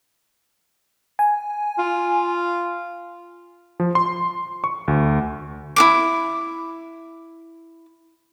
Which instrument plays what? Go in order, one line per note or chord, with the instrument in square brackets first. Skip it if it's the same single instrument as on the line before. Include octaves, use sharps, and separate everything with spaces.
[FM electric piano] G#5
[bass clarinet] F4
[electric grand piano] F3
C6
C#6
D2
[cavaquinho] E4 C5 D6